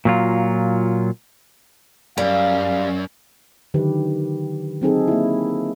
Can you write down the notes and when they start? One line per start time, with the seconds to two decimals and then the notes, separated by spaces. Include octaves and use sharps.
0.05 A#2 F#3 F4
2.18 F#2 G3 F5
3.74 D3 D#3 F#3 G4 B4
4.82 F#3 C4 D#4 G#4 A4
5.08 A#3 E4